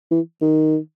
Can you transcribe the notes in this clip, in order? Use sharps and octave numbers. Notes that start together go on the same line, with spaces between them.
E3
D#3